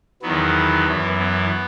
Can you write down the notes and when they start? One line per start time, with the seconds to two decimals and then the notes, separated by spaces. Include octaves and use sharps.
0.22 E2 D#3 F#3 B3
0.86 F#2 E3
1.18 B3